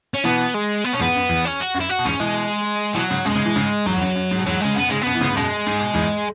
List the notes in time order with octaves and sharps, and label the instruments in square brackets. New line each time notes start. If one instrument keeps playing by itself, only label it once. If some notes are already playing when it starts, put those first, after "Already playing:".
[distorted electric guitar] C#4
[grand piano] B2 E3 [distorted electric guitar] B3
[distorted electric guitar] G#3
B3
[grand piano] B2 [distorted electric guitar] C#4
[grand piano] E2 G#2 [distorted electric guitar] B3
[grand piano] F#2
E2
[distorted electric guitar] C#4
F#4
[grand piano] F#2
[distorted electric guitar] E4
F#4
[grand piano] B2
[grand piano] E2 G#2 [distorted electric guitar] C#4
[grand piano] B2 E3 [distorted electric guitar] G#3
[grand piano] B2 E3 [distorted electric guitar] F#3
[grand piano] G#2 C#3
[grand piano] F#2 B2 [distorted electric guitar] G#3
[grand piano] G#2 C#3
B2 E3
G#2 C#3
[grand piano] E2 G#2 [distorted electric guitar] F#3
[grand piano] E2
F#2
F#2
G#2
B2
[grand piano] E2 G#2 [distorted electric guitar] F#3
[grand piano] C#3 [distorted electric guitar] G#3
[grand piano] F#2 B2 [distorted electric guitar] B3
[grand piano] G#2 C#3 [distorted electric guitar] G#3
[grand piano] F#2 B2 [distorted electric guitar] B3
[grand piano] E3
G#2 C#3
G#2
[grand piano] F#2 B2 [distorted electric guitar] G#3
[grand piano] G#2
B2
E2 G#2